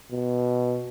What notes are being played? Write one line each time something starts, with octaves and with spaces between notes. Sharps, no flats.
B2